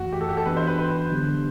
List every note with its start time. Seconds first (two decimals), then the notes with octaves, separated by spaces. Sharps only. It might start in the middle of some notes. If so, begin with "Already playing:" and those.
Already playing: F#2 E3 A3 F#4
0.13 G4
0.21 A4
0.29 G4
0.37 A4
0.46 E3 B3 D4 F#4 B4
0.57 C5
0.67 B4
0.78 B4
1.10 D3 F#3 B3 D4 G4